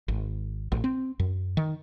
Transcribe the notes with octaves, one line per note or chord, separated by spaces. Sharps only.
G#1
A1
C4
F#2
D#3